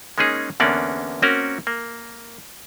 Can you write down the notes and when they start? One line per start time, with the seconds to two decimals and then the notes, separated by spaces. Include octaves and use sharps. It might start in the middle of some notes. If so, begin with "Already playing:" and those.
0.18 G#3 A#3 C#4 D#4 G#4
0.60 E2 D3 A#3 B3 C#4 D5
1.22 A#3 C4 C#4 F#4 A#4
1.67 A#3